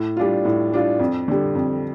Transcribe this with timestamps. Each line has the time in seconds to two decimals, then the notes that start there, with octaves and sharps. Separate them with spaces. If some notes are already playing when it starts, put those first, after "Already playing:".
Already playing: A2
0.17 G3 D4 F4
0.45 A2
0.72 G3 D4 F4
0.99 F2
1.28 D3 G3
1.55 F2